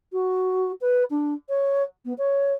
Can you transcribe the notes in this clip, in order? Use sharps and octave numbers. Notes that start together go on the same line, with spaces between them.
F#4
B4
D4
C#5
B3
C#5